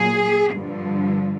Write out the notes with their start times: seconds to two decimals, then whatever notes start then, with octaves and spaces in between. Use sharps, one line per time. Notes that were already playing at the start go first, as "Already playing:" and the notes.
Already playing: A#2 F#3 G#4
0.52 G2 D3 F3